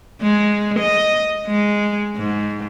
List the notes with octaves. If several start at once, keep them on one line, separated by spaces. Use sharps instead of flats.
G#3
D#5
G#3
G#2